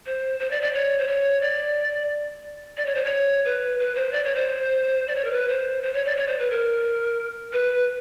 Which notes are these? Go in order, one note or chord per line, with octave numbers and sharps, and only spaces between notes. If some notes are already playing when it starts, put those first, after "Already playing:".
C5
C5
D5
D5
C#5
C5
C#5
D5
D5
C#5
C5
C#5
B4
B4
C5
D5
C#5
C5
D5
C#5
A#4
B4
C5
C5
C#5
D5
C#5
C5
B4
A#4
B4